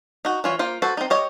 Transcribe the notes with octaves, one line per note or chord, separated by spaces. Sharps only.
D#4 F#4
E3 F4 C#5
A#3 F4 C5
F#4 A4 B4 C5
C4 D#4
G4 C#5 D#5